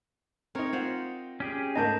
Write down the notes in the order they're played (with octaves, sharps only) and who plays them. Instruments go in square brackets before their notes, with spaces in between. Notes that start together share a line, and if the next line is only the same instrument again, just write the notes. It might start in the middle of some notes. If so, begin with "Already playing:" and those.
[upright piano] C4 D#4 [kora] A#4 C#5
[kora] F4 C5 F#5
[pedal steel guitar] C#4 G4 G#4
[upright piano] G#2 A3 A#4 [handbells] D#5 A5 G6